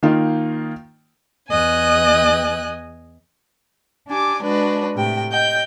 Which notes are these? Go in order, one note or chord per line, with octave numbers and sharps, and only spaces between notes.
D#3 A#3 D#4 F4
E2 D#5 G#5 F#6
D4 G4 G#5 D6
G#3 D4 F#4 B4
A2 C3 G5
D#5 G5 G6